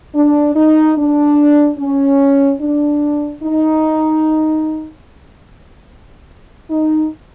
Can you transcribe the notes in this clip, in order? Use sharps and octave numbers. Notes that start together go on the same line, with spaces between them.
D4
D#4
D4
C#4
D4
D#4
D#4